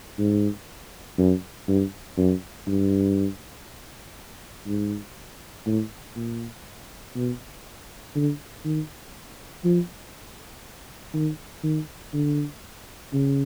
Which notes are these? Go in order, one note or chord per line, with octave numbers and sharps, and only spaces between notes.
G#2
F#2
G2
F#2
G2
G#2
A2
A#2
B2
D3
D#3
F3
D#3
D#3
D3
C#3